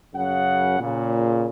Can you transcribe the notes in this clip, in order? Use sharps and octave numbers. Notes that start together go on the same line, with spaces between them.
F#2 C#3 F#5
A#2 C#3